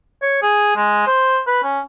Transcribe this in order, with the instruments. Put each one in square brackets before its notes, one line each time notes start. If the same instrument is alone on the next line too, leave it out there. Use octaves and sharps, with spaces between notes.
[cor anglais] C#5
G#4
G#3
C5
B4
C#4